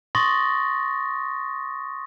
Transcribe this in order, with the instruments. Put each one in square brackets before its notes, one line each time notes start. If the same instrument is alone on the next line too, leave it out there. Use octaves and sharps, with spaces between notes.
[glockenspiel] C6 C#6 D#6 A6 A#6